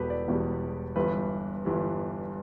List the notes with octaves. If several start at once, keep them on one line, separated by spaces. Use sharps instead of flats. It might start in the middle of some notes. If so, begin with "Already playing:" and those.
Already playing: E1 E2 B2 G3 G4 A4 B4
D5
E1 E2 B2 G3
G1 G2 E3 G3 B4
G1 G2 E3 G3